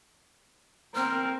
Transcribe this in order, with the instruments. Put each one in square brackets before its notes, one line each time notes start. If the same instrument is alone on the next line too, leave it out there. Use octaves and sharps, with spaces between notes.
[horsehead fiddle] C4 A#4 [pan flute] F6